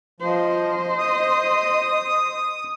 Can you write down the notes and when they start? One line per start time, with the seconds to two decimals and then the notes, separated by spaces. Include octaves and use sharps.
0.20 F3 C5 D#5
0.99 D#6